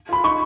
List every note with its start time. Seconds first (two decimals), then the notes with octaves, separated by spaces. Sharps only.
0.09 F4 B5
0.24 D#4 C#6